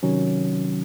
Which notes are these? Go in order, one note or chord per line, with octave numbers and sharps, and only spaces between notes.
C3 D#3 F#3 C#4